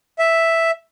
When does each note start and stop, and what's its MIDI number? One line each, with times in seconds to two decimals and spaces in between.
0.19 0.71 76